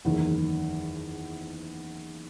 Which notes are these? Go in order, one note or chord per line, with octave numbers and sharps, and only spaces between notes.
F#1 E2 D#3